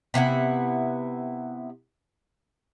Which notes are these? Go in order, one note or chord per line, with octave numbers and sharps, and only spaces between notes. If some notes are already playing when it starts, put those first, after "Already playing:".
C3 B3 E4 F#5